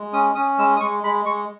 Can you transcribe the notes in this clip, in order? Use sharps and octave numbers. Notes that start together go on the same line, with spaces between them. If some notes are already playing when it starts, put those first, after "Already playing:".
Already playing: G#3
C#4 D#6
C#4 D#6
G#3 E6
D#6
G#3 C#6
G#3 B5
G#3 C#6